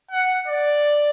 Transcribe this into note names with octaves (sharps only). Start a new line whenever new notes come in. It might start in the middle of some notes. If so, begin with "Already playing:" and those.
F#5
D5